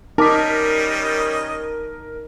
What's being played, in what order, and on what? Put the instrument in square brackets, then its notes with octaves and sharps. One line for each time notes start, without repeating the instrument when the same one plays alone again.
[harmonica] G3 C#4 D#5 [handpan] D#4 [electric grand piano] A#4 B6 [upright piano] A5 D6